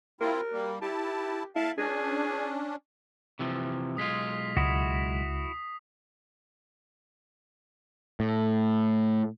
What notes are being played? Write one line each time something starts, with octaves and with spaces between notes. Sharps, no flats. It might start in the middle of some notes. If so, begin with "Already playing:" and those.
C4 E4 F4 A#4
G3 A#3
E4 G4 A5
E4 F5 A5
C#4 D4 G#4
C3 E3 F3
B1 G#3 F4 D#6 B6 C7
C#2 E4 F#4 D#6
A2